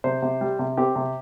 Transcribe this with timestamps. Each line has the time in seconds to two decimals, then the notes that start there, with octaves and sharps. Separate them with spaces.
0.04 C3 C5
0.22 C3
0.41 G3
0.59 C3
0.77 C4 G4
0.96 C3